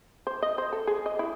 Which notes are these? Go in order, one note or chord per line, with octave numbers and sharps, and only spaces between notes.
C5
D#5
C5
A4
G#4
D#5
E4